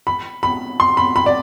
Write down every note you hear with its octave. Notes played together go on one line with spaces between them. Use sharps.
B5
B5
C6
B5
B5
D5